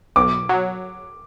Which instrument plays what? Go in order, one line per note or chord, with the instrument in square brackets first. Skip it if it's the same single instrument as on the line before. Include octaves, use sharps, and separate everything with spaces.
[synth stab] B1 [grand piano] D6
[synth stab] F#3